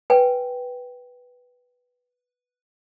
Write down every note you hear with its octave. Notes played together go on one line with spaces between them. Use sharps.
B4 G5 G#5